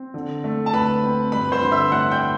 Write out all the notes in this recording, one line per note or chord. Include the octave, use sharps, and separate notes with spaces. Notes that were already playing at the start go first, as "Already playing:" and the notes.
Already playing: C4
D3
A3
A5
D2 B4 B5
C4
G2 B4 B5
C5 C6
D3
E5 E6
A1 F#5 F#6
G5 G6